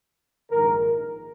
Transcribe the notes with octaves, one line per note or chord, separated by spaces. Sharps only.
A#1 G#2 D#3 A#4